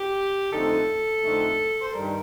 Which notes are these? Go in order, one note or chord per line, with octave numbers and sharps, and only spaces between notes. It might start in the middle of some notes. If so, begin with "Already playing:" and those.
Already playing: G4
F2 D3 A3 C4 D#4 A4
F2 D3 A3 C4 D#4
C5
G2 D#3 G3 A#4